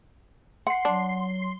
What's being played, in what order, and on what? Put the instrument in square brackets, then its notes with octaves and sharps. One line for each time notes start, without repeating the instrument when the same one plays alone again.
[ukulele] F#5 [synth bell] C6 C7
[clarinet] F#3 [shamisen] D4